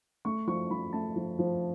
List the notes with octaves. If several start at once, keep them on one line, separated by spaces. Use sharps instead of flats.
A3 C#6
F3 C#6
F3 B5
A3 A5
F3
F3